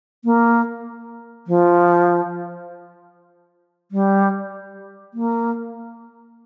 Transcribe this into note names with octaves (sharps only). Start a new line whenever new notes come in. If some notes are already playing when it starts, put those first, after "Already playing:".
A#3
F3
G3
A#3